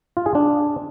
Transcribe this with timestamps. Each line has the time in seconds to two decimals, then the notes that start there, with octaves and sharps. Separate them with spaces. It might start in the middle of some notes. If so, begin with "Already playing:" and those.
0.17 F4
0.26 G#4
0.35 D4